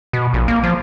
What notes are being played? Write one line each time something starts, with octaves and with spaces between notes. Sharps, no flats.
B2
A#1
A#3
F3